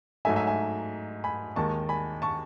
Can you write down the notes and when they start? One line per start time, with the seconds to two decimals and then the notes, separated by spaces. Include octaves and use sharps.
0.25 G#2 F#3 A3 D#4 E5 G#5
0.36 E5 G#5
0.47 E5 G#5
1.24 G#5 B5
1.56 D#2 D#3 G#3 A5 C#6
1.89 G#5 B5
2.22 A5 C#6